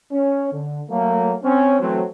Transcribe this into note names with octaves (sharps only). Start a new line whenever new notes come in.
C#4
D3
F#3 A3 A#3
C4 C#4
E3 F#3 A3 C4